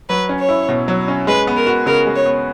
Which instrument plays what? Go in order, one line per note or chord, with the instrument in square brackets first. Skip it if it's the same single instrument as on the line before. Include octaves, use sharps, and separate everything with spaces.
[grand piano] F#3 [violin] B4
[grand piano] C#4
[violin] C#5
[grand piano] E4
B2
F#3
C#4
[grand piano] G#3 [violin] B4
[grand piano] B3
[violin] A#4
[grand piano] F#4
[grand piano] C#3 [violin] A#4
[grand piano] G#3
[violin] C#5
[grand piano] B3